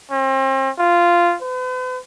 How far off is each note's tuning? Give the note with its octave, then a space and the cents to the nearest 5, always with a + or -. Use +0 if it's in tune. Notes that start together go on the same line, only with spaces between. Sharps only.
C4 +40
F4 -10
B4 +45